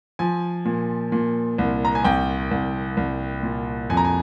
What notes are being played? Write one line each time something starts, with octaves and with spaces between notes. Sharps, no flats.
F3 G#5
A#2
A#2
C2
A#5
G#5
C2 G5
C2
C2
A#2
F2 G#5
A#5
G#5